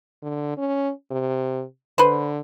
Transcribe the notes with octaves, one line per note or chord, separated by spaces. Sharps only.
D3
C#4
C3
D3 B4 C5